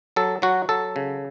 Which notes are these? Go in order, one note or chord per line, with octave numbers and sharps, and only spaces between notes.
F#3 A4
F#3 F#4
F#3 A4
C#3